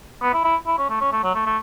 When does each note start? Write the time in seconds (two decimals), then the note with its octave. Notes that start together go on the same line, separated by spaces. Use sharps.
0.22 B3
0.33 E4
0.44 E4
0.67 E4
0.78 C#4
0.89 A3
1.01 C#4
1.12 A3
1.23 F#3
1.35 A3
1.46 A3